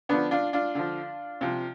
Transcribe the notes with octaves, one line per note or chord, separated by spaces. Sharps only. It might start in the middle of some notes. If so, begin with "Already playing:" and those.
D3 F3 B3 D4
D4 F4
D4 F4
D3 F3
C3 F3